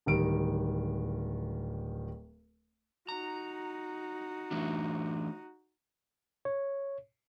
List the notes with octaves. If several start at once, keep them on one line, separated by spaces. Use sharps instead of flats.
D1 D#3 G3 D7
D#4 F#4 A#5
E3 A3 D4
C#5